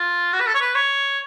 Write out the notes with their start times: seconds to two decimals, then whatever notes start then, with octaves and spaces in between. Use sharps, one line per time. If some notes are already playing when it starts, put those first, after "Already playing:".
Already playing: F4
0.33 F#4
0.40 B4
0.47 A4
0.55 C#5
0.61 B4
0.75 C#5